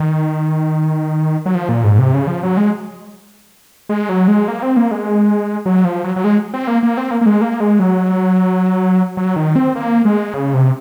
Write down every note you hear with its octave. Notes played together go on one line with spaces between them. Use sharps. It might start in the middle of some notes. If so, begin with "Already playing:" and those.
Already playing: D#3
F#3
F3
A#2
G#2
C3
C#3
F3
F#3
G#3
G#3
F#3
G#3
A#3
C4
A#3
G#3
F#3
F3
F#3
F#3
G#3
C4
A#3
A#3
C4
A#3
A#3
G#3
A#3
G#3
F#3
F#3
D#3
C4
A#3
G#3
C#3
C3